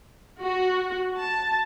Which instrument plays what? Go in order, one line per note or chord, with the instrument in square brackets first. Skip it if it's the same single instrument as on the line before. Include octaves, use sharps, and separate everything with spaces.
[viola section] F#4
A5